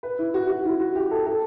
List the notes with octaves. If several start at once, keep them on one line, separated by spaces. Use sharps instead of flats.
B4
E4
F#4
F#4
E4
F#4
G4
A4
A4